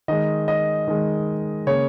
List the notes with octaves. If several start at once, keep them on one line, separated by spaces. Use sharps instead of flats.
D#3 G#3 D#5
D#5
D#3 G#3
C#3 A#3 C#5